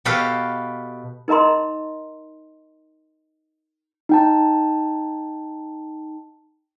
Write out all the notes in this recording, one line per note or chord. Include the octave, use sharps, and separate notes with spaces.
B2 G4 A4 B4 F5
D#4 A#4 D#5 A#5 C6
D#4 G5 A5